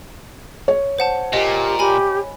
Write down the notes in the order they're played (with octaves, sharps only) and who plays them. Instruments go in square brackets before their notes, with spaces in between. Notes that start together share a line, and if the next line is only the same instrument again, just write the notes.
[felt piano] C#5
[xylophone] C5 F#5 A5
[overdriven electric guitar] A#2 [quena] G4 [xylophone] D#5
[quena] G4 [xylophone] G#5 B5